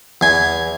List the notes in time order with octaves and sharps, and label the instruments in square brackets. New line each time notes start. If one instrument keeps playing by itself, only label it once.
[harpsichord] E2 G#5